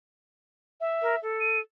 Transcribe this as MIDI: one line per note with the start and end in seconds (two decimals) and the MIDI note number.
0.81 1.19 76
1.02 1.15 70
1.22 1.60 69
1.40 1.59 99